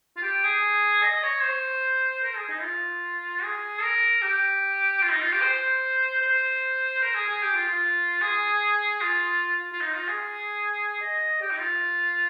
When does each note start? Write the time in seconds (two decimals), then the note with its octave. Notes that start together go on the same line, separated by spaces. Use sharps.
0.17 F4
0.23 G4
0.44 G#4
1.03 D#5
1.23 C#5
1.43 C5
2.23 A#4
2.36 G#4
2.49 D#4
2.62 F4
3.43 G#4
3.82 A#4
4.22 G4
5.02 F4
5.12 D#4
5.22 F4
5.33 G4
5.42 C5
6.22 C5
7.02 A#4
7.15 G#4
7.29 G#4
7.42 G4
7.55 F4
7.68 F4
8.21 G#4
9.01 F4
9.73 F4
9.81 D#4
9.94 F4
10.08 G#4
11.01 D#5
11.41 G4
11.51 D#4
11.60 F4